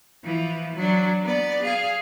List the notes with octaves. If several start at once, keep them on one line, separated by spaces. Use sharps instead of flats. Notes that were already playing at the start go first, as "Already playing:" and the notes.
E3 F3
F#3 D4
B3 D5
G#4 F5